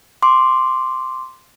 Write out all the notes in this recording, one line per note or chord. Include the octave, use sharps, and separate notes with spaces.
C6 D6